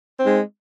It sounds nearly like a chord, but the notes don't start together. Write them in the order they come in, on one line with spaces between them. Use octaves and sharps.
C4 D#4 G#3